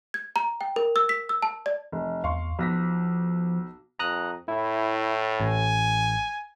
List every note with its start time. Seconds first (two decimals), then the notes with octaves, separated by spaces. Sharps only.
0.14 G#6
0.36 A#5
0.61 G5
0.76 A#4
0.96 E6
1.09 B6
1.29 E6
1.42 A5
1.66 D5
1.92 F1
2.24 E2 F5 C6 C#6
2.59 B1 F3 A#6 B6
3.99 F2 A#5 D#6 F#6
4.48 A2 E4
5.40 A1 G#5